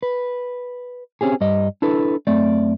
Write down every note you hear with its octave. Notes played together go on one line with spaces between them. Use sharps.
B4
C4 C#4 G4 G#4
G2 G3 D#5
D4 E4 A4 B4
F#2 A3 C4 D5